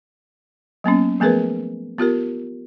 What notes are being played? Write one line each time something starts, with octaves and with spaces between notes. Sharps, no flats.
F#3 A#3 B3 C#4
F3 A3 B3 G#4 A#4 B4
B3 F4 G4 A#4